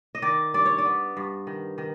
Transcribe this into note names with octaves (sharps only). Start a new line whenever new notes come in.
D#5
D#3 D5
G2 D5
C#5
D5
B3
G2
D#3
D#3